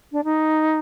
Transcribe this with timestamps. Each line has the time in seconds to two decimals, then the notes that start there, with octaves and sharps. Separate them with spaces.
0.12 D4
0.24 D#4